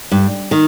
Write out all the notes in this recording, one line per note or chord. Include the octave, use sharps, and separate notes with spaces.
G2
D#3